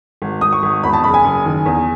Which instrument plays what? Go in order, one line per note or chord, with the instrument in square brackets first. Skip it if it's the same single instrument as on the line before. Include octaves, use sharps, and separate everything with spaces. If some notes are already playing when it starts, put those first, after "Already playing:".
[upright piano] G#1
G#1 D#6
C#6
G#1
E2 B5
A5
F#1 B5
G#5
F#1
D#3
E2